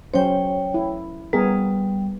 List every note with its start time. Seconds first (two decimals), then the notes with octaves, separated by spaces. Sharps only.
0.14 F#3 C#4 C5 C#5 G5
0.74 E4
1.33 G3 B3 G#4 A#4